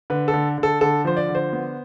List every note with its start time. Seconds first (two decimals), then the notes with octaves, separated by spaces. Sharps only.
0.10 D3 B4
0.28 A4
0.34 D3
0.58 D3
0.63 A4
0.81 D3 A4
1.05 F3 C5
1.17 D5
1.29 D3
1.35 C5
1.53 B3